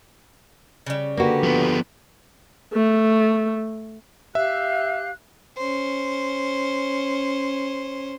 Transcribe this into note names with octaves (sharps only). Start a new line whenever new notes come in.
C#3 G3
D3 A#3 F#4 G4 B4
F3 B3
A3
G4 E5 F5 F#6
C#4 C5